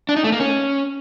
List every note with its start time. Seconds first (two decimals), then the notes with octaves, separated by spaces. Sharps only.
0.09 D4
0.16 D#4
0.24 A3
0.32 A#3
0.40 C#4